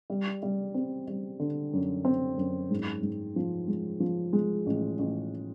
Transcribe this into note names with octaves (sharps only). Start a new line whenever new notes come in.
G3
G3
C4
G3
D3
F#2
C4
F#2
G#2
G#2
F3
G#3
F3
G#3
A1
A1